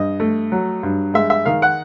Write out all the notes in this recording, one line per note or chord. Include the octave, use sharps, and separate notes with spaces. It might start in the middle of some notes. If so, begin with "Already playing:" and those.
Already playing: G2 D#5
A3
F#3
G2
G#3 E5
E5
D#3 F5
F#5